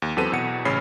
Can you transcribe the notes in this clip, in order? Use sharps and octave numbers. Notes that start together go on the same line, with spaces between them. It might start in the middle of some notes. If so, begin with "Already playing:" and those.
D#2
E2 F#3 C4 A4 B4 D#7
E2 B2 F#5 C#7
A1 C#3 C#4 B5 F6 C7